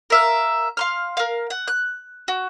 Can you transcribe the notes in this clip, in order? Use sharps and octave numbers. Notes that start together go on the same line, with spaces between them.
A#4 E5 F5
F5 C6 F6
A#4 F5
F#5
F#6
F#4